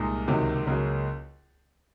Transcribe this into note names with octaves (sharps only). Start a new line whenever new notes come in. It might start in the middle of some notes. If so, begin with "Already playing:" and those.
Already playing: C2 A#2 G#3 D#4
C#2 C3 D#3 F#3 A#3
C#2 C#3 F#3 A#3